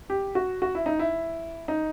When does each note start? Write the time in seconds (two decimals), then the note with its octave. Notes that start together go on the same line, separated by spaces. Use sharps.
0.10 G4
0.35 F#4
0.62 F#4
0.75 E4
0.86 D#4
0.99 E4
1.68 D#4